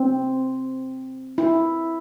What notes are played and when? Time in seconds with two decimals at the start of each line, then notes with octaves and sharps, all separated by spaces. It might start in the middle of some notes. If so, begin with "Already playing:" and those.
Already playing: C4
1.38 E4